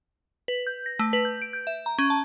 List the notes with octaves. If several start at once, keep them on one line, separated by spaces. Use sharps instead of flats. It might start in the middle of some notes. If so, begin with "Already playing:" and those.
B4
G6
A#6
A3
B4
G6
D7
G6
E5
A#5
C#4
A5